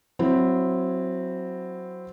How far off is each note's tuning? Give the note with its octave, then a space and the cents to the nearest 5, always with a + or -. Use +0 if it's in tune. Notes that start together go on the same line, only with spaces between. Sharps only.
F#3 +0 C4 +0 E4 +15